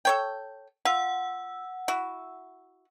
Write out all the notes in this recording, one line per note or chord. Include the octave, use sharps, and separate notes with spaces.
A4 C#5 G5
F4 F#5 E6
E4 F#4